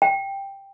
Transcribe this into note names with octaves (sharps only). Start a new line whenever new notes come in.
G5